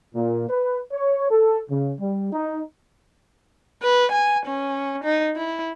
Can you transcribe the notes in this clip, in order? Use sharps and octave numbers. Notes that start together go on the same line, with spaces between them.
A#2
B4
C#5
A4
C#3
G3
D#4
B4
G#5
C#4
D#4
E4